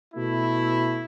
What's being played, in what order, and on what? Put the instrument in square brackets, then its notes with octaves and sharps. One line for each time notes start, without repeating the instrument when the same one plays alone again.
[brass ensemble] B2 A3 E4